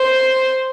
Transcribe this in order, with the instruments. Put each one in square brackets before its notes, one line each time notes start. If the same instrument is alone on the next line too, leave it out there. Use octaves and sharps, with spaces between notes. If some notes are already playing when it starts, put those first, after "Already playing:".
Already playing: [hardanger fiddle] C5